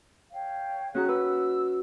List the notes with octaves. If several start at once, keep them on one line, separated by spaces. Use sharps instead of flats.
C#5 F5 G5
C#4 D#4 F#4 G#4 A#5 F#6
B4 E6